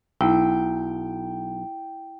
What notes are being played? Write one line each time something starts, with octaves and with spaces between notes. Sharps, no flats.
B1 E4 G5